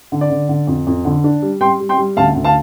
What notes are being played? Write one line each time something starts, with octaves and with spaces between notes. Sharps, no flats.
D3
D5
D3
D3
F2
F2
D3
D4
G3
G3 G5 C6
G3
G5 C6
G3
D2 F5 A5
D2
F5 A5